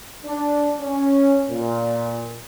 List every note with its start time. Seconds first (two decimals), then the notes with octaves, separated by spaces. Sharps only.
0.25 D4
0.81 C#4
1.49 A#2